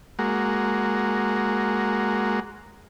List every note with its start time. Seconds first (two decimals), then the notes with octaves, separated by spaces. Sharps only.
0.19 G#3 A#3 F#4